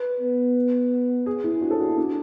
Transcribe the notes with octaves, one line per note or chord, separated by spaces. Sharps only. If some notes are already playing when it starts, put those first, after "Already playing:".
Already playing: B4
B3
G#4
E4
D4 F#4
A4
F#4
E4
D4